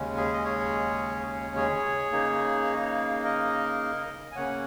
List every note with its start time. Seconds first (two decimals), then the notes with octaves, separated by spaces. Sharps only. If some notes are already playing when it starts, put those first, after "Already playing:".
Already playing: D#2 C#3 G#3 C#4
0.17 G#4
0.34 D#5
0.44 G#4 C#5
1.56 G#4 C#5
2.12 C#3 A#3 D#4
3.24 A#4 D#5
4.32 G#5
4.36 C#3 A#3 C#4 C#5 F#5